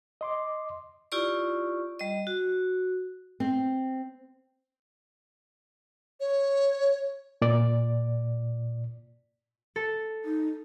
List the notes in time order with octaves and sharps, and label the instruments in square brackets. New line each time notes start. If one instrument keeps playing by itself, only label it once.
[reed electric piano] D#5 C6 D6
[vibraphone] E4 F4 G4 D5 C#6
G3 D#5
F#4
[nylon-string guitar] C4
[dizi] C#5
[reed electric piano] A#2 D5
[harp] A4
[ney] D#4